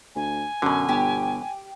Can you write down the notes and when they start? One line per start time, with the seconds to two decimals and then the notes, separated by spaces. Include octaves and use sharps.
0.15 D2 G#5
0.62 F#2 B2 D3
0.89 G1 G4